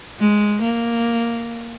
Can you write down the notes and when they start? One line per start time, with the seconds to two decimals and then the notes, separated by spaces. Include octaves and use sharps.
0.19 G#3
0.61 A#3